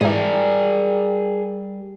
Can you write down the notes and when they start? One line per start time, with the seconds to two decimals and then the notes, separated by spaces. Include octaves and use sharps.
0.01 G#2 E3 G3 G#4 A#4